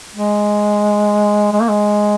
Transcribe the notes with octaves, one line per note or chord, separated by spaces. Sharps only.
G#3
G#3
A#3
G#3